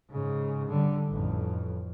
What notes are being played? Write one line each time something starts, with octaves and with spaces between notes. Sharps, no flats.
G#2 C#3
D3 G3
A1 F2